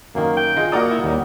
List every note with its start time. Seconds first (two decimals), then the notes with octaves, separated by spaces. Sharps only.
0.15 F#2 D#3 A#3
0.37 G5
0.56 F4 G#4 D#5
0.72 A#3 F#4 A#4 D5 F#5 A#5 D#6
0.90 E4
1.04 D#2 G3